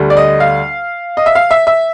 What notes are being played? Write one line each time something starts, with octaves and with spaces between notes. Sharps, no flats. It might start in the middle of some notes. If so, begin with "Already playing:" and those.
Already playing: D2 D3 G3
D5
D#5
F5
D#5
E5
F5
E5
E5